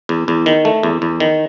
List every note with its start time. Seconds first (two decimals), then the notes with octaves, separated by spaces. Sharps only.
0.09 E2
0.28 E2
0.46 D#3
0.65 A3
0.83 E2
1.02 E2
1.20 D#3